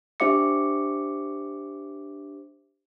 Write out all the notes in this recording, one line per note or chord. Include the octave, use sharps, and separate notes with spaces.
D4 G4 C5 E5 D6 C#7